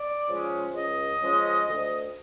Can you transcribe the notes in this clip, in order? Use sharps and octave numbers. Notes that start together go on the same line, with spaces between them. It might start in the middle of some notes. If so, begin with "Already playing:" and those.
Already playing: D5
C#3 F3 G#3 C#4
C#2 D#5
C#3 F3 G#3 C#4
D2